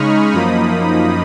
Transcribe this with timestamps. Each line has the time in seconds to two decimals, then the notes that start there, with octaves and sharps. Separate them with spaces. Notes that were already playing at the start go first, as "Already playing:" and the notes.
Already playing: C#3 G#3 D#4 B5 C#6 D#6 F6
0.33 F#2 F3 A#3 D#4 B5 D#6